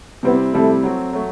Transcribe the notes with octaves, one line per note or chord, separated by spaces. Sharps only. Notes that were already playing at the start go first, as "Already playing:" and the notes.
C3 G3 B3 C4 E4
C3 G3 A3 C4 E4
F#3 A3 C4
F#3 A3